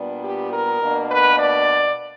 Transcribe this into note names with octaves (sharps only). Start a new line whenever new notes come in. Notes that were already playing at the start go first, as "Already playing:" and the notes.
Already playing: A#2 G3 B3 D4
G4
A#4
B2 A#3 D4
B4
D5